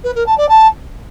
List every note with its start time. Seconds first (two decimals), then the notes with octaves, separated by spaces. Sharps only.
0.03 B4
0.15 A#4
0.26 A5
0.37 D5
0.48 A5